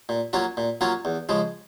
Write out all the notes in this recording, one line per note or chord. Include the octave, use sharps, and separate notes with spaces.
A#2
F#3 A#3 C#4 F4
A#2
F#3 A#3 C#4 F4
E2
C#3 F3 G#3